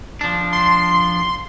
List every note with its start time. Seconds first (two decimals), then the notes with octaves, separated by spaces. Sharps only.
0.21 F3 D4
0.53 C6